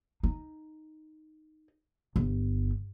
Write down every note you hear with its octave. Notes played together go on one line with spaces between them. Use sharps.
D#4
G1